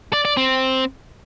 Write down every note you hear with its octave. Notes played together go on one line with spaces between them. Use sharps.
D5
D5
C4